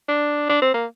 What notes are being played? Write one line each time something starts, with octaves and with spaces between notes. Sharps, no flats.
D4
D4
C4
A#3